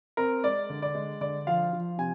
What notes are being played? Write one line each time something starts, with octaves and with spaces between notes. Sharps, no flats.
C4 A#4
G#3 D5
D3
D5
G#3
D3 D5
F3 F5
F3
C3 G#5